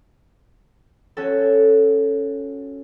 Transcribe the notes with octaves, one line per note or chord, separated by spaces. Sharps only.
C#4 F#4 A4